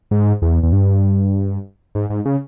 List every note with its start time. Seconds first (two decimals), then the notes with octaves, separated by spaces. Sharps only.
0.11 G#2
0.42 E2
0.63 E2
0.72 G2
1.95 G#2
2.10 G#2
2.25 C#3